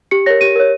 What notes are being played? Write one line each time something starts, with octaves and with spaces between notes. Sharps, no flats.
G4 C#7
A#4 C#5 A#6
G4 D#7
A#4 C#5